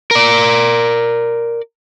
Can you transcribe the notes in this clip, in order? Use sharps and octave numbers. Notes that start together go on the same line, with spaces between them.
A#4 D5